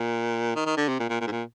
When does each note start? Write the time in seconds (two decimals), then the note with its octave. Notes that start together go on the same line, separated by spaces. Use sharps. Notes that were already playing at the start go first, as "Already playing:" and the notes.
Already playing: A#2
0.56 D#3
0.66 D#3
0.77 D3
0.88 C3
1.00 A#2
1.10 A#2
1.21 A#2
1.27 G#2
1.32 A#2